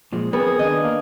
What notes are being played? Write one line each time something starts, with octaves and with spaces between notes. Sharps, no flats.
A#2 F3 G#3
B3 C4 G#4 A#4 C#5
D#3 D4 D#5
A#3